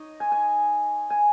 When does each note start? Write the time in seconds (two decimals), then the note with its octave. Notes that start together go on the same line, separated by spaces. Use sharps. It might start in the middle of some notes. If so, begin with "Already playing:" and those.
Already playing: D#4 C#5 D#5
0.20 G#5
0.32 G#5
1.10 G#5